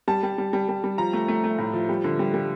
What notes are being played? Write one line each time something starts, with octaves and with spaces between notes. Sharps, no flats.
G3 A5
G3
G3
G3
G3
G3
F3 A#5
A3
A3
A3
A2
F3
G3
D3
G3
G3